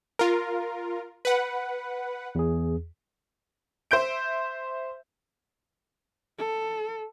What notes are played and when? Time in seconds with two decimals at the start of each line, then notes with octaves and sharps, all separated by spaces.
0.19 F4 A#4
1.25 B4 F#5
2.35 E2 G#4
3.91 C5 E5 G6 D7
6.39 A4